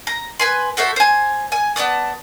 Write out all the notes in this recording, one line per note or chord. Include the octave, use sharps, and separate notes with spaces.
A#5
B4 G#5 C6
F#4 A4 C5 E5
C5 G#5
G#5
B3 D5 A5 D#6